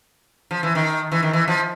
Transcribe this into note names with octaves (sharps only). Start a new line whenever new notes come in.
F3
E3
D#3
E3
D#3
E3
F3